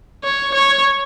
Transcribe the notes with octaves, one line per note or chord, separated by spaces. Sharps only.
C#5
C#5